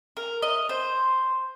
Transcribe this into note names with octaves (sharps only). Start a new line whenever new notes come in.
A#4
D#5
C5